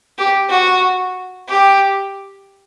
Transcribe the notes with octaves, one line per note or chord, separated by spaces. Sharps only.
G4
F#4
G4